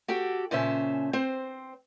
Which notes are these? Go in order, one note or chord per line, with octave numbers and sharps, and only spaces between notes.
F#4 G4 A4 G5
A#2 C#3 C#4 C5 E5 A5
C4 C5